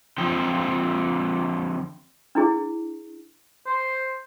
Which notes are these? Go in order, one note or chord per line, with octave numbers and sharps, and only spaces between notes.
D3 F3 C4 G5
D4 E4 G#4
C5